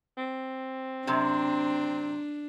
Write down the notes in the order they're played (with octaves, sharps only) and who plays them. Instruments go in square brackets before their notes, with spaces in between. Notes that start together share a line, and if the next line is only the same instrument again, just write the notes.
[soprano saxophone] C4
[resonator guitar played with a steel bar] F#2 C3 [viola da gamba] D4